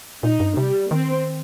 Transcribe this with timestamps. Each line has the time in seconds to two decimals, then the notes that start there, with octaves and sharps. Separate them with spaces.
0.23 A#2 D#4
0.40 G2
0.57 C3 G3
0.91 D#3 C4